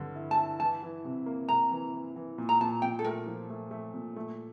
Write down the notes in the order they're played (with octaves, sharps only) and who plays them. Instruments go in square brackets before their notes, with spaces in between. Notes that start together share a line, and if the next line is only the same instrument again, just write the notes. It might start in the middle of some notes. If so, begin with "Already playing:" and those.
Already playing: [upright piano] G2 D3
E4
[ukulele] A5
[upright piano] E4
[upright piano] E3 [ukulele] A5
[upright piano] E3
C3
A#3
[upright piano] C3 [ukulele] A#5
[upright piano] E3
E3
E3
A#2
[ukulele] A#5
[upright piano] A#2 [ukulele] A5
[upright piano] A#2 [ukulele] G5
[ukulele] A4
[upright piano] A3 [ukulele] A#4
[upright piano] F3
A3
A3
A#2
A3